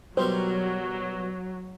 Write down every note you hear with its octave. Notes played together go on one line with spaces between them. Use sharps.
B2 F#3 G3 A#4 C5